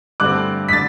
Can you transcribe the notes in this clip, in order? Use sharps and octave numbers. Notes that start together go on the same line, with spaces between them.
G2 D3 A3 C4 D6 F#6
B6
D3 A6